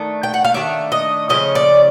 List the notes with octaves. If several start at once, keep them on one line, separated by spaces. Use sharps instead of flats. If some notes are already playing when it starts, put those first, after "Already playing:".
Already playing: D#3 A3 D4
G5
F#5
F5
D#3 F#3 A3 D4 E5
D#5
C#3 F3 A3 C#4 D#5
D5